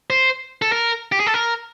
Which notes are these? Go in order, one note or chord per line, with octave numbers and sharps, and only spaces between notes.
C5
A4
A#4
G4
G#4
A4
A#4